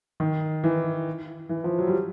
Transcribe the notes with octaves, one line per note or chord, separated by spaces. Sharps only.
D#3
E3
E3
F3
F#3
G3